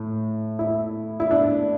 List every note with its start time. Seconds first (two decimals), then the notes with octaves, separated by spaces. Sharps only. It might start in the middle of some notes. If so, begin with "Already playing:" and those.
Already playing: A2
0.59 E4
1.20 E4
1.31 D4